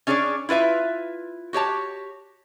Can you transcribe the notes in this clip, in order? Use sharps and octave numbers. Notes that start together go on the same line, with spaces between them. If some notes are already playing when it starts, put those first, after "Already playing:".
C#4 D4 G#4 B4 C#5 D5
E4 F4 B4 E5
F#4 G4 C#5 A5